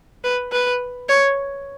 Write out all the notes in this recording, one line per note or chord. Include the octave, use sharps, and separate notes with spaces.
B4
B4
C#5